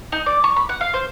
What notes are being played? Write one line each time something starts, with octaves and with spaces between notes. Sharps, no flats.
D#4
D5
C#6
B5
F#5
F5
C5